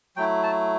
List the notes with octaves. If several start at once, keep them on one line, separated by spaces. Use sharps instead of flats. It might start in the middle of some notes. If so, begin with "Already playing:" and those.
F#3 A3 E4 G5
A5